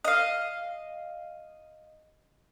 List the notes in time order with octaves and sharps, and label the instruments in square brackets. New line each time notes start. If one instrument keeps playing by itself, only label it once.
[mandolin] D#5 F5